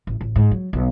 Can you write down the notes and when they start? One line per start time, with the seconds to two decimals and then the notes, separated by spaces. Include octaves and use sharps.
0.07 A1
0.21 A1
0.36 G#2
0.51 F#3
0.73 B1